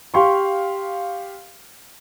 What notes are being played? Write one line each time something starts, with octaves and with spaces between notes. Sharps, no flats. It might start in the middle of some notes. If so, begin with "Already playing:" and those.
G4 F5 C6 C#6